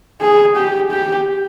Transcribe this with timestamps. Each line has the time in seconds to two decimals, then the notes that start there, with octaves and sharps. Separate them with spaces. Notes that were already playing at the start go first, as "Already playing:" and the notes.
0.21 G#4
0.55 G4
0.91 G4